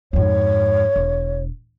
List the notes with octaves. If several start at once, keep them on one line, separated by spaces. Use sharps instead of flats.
F2 G#2 C#5
E1